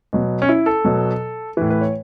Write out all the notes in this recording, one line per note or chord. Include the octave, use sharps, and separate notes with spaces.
B2 F#3
C#4
E4
A4
B2 F#3
A2 E3 B4
B4
C#5